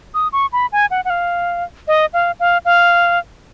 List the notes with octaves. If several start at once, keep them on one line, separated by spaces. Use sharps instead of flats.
D#6
C#6
B5
G#5
F#5
F#5
F5
D#5
F5
F5
F5